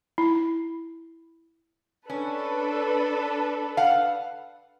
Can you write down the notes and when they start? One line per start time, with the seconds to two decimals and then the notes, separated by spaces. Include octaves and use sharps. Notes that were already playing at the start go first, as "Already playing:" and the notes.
0.18 E4
2.10 C#4 D4 A4 B4
3.77 F5 F#5